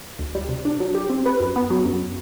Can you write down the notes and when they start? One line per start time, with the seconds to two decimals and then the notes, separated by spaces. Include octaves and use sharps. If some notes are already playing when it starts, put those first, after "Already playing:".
0.19 D2
0.35 G3
0.49 C3
0.65 D4
0.80 F#3
0.95 G4
1.10 C4
1.26 B4
1.40 F#2
1.56 B3
1.70 F#3
1.85 F#2